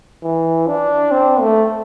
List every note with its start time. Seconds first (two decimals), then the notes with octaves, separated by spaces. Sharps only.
0.23 E3
0.67 D4
1.11 C4
1.40 A3